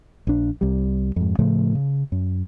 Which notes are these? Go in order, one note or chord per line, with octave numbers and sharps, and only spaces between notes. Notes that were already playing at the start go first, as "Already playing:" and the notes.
A#1 D4
C2 G3
F2 G#2
A2 C#3 F3 A3
C#3
F#2